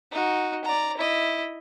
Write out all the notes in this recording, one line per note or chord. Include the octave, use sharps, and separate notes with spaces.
D#4 F#4
D5 A#5
E4 D#5